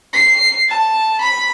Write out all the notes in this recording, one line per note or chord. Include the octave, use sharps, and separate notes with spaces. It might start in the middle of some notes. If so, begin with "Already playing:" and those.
C7
A5
B5